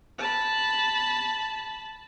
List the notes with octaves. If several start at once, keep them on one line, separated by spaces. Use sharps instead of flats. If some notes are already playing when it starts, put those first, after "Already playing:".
A5 B5